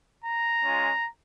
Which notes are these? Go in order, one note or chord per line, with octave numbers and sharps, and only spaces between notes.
A#5
G#3 C#4 F4